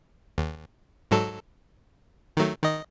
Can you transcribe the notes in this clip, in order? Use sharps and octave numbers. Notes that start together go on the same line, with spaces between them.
D#2
G#2 F#3 A4
D#3 F#3 A3
D#3 D#5